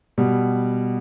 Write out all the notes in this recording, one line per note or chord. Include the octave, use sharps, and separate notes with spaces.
B2 G3